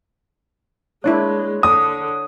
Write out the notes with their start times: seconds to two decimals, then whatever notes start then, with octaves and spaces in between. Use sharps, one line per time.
1.04 G#3 A#3 D4 E4 C#5 F#6
1.63 D3 D#6